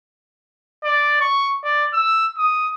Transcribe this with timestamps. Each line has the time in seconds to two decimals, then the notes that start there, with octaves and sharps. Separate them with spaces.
0.84 D5
1.21 C#6
1.64 D5
1.93 E6
2.37 D#6